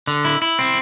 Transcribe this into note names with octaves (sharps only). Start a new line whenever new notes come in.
D3
E4
E4
C4